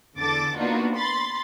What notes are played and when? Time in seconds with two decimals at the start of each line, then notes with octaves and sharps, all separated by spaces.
0.17 E2 D3 A4 D6 A6
0.56 A#3 B3 D4 D#4 F4 F#4
0.95 B5 C6 A6